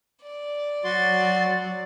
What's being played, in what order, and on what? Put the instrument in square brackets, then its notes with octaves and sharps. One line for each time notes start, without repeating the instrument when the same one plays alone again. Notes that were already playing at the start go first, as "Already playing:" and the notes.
[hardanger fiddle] D5
[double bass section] F#3 [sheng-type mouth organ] F#4 C6 [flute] A6